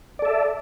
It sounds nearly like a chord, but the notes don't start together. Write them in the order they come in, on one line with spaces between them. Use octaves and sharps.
D5 A4 E5